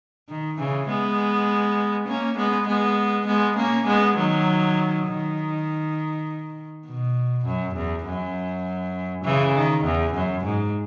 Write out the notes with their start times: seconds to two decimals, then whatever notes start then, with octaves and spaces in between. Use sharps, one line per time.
0.29 D#3
0.58 C#3 E3
0.88 G#3 B3
2.07 A#3 C#4
2.37 G#3 B3
2.68 G#3 B3
3.27 G#3 B3
3.57 A#3 C#4
3.87 G#3 B3
4.17 D#3 F#3
5.06 D#3
6.86 B2
7.45 F#2
7.75 E2
8.05 F#2
9.24 C#3 E3
9.55 D#3
9.85 E2
10.14 F#2
10.44 G#2